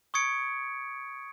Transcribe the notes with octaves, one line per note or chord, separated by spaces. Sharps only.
C#6 D#6 G#6 C#7 D7